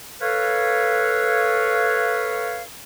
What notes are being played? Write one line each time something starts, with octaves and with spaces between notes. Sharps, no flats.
A4 B4 C#5 F5